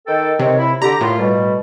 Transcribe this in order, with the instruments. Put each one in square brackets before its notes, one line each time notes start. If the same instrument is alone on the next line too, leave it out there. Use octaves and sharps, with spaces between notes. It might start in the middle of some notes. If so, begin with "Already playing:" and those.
[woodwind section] D#3 A4 G5
[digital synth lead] C3 [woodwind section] D#3 C4 C#5
[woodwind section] E4
[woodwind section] D3 G4 [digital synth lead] A#5
[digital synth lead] A2 [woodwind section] A#3 E4 F4
[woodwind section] B2 G3